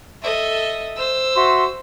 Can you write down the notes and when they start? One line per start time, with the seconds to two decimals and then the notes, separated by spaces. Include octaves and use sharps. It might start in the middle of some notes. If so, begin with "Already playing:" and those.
0.21 A4 D#5 E5
0.96 C5 E6
1.36 F#4 E5 C6